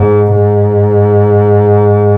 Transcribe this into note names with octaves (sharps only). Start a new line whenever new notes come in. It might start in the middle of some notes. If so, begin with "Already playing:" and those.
Already playing: G#2
G#2